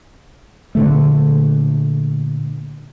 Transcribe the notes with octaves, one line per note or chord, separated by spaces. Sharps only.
A#2 D3 A3